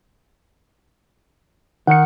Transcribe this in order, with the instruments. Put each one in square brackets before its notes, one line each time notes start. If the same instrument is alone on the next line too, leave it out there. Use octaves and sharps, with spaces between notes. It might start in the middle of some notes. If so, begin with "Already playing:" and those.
[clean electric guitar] D#3 [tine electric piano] F#5 C#7